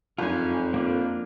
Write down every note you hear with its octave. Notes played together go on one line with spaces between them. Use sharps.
F#1 F2 G#2 F4 G#5
A#3 D4 F4